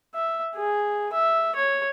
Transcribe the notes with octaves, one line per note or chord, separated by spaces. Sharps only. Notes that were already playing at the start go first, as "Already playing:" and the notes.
E5
G#4
E5
C#5